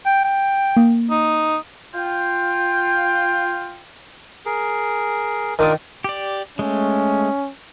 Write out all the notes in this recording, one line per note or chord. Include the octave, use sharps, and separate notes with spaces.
G5
G5
A#3
D#4
F4 G5
G#4 A#4
D#3 D4 F4 A#4 D5 D#6
G4 D5
G#3 A3 C#4